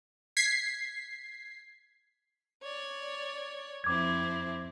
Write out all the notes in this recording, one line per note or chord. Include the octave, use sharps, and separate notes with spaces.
G#6 B6 C7
C#5 D5
F2 C4 E4 D6 G#6